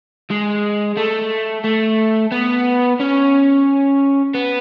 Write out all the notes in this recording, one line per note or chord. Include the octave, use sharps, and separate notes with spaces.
G#3
A3
A3
B3
C#4
B3